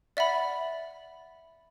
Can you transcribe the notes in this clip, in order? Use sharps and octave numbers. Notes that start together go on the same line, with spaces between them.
D5 E5 F#5 B5